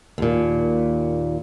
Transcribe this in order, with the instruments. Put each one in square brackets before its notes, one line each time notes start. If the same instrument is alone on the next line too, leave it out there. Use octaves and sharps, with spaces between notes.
[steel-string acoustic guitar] D#2 A#2